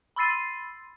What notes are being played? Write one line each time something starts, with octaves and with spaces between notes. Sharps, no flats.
B5 C6 E6 A6 C7 D#7